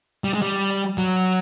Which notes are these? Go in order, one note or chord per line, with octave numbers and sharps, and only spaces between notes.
G3
G#3
G3
F#3